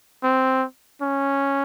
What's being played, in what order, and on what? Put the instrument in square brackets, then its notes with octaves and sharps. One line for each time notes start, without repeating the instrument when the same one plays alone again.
[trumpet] C4
C#4